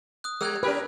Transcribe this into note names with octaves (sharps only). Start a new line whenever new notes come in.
D#6 F#6
G3 E6 F#6 G#6
C#4 G4 A#4 B4